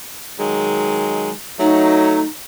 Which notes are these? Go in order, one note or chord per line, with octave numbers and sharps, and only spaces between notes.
D#3 F#3 G#3
F#3 A3 D#4